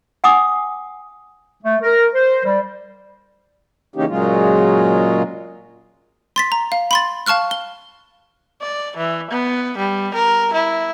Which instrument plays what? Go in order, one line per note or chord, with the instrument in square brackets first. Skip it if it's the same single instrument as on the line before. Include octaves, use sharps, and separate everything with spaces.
[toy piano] F#5 G#5 D6 D#6
[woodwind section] A3
A#4
C5
G3
[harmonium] C#3 E3 A#3 C#4 D#4 G4
A#2 C#3 F#3 G#3 F4
[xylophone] C6 A6 B6
A#5
F5
B5 C6 A6
F5 A5 C#6 F6 F#6
G7
[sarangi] D5
E3
B3
G3
A#4
E4